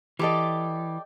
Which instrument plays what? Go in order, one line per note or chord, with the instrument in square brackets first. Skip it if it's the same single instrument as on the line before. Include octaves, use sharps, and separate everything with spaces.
[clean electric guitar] E3 [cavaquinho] G4 A4 D5 [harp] D#5 D6